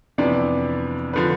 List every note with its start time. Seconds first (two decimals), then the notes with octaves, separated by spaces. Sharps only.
0.18 F2 C3 E3 B3 D4 D5
1.13 D3 F3 B4